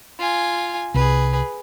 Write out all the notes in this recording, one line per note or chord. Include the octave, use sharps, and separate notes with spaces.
F4 G#5
C2 G#4 B4